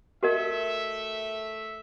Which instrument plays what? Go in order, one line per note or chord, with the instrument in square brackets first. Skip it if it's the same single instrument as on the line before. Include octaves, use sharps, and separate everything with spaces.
[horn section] A3 E5 [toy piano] F#4 A#4 D#5